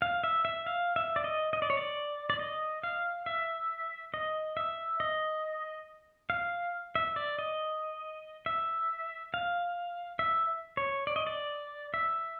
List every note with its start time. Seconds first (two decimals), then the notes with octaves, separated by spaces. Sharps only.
0.02 F5
0.24 E5
0.45 E5
0.66 F5
0.96 E5
1.16 D5
1.24 D#5
1.53 D#5
1.62 D5
1.70 C#5
1.77 D5
2.30 D5
2.39 D#5
2.83 F5
3.26 E5
4.14 D#5
4.57 E5
5.00 D#5
6.30 F5
6.95 E5
7.16 D5
7.39 D#5
8.46 E5
9.34 F5
10.19 E5
10.77 C#5
11.07 D5
11.16 D#5
11.27 D5
11.94 E5